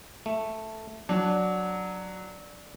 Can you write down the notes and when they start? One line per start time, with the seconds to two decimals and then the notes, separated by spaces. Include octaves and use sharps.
0.26 A3
1.09 F#3 D4